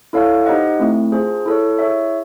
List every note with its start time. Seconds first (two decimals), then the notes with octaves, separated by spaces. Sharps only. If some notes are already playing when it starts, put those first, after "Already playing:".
0.13 E4 A4 C#5 F5
0.45 D#4 G4 C5 D#5 F#5
0.79 A3 C4 E4
1.12 D4 F4 G#4 C5
1.46 E4 A4 C#5
1.79 E4 G#4 C#5 E5